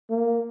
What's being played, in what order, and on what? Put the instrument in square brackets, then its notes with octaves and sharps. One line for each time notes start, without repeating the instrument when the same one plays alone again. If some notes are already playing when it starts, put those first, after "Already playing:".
[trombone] A#3